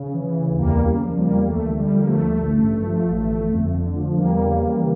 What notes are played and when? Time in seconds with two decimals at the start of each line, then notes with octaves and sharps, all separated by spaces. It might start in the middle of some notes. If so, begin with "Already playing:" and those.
Already playing: C#3
0.14 E3
0.37 D2
0.59 E2 G3 A#3
0.82 C#3
1.04 F3
1.18 G3 A#3
1.26 E2
1.49 D2 A3
1.71 D3
1.79 G3
1.93 F3
2.01 A#3
2.08 A3
2.15 D2
2.38 A1
2.61 G2
2.83 F3
3.06 A1
3.28 G1
3.49 F2
3.72 D3
3.95 F3
4.16 E2 G3 A#3
4.40 C#3
4.62 E3